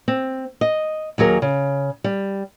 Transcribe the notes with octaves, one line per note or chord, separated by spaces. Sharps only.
C4
D#5
D#2 F#3 G#4 A#4
C#3
G3